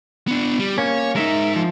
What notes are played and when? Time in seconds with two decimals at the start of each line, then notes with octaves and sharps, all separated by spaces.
0.28 B3 D4
0.59 G3
0.78 A#3 C#4 C#5
1.16 G#3 D#4 A#4 E5
1.56 F3